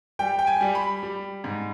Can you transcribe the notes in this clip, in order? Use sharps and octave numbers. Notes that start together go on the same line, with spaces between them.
G3 G5
G5
G#5
G3
B5
G3
G#2